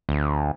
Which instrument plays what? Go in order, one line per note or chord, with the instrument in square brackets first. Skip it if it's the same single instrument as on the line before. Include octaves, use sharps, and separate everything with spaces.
[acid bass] D2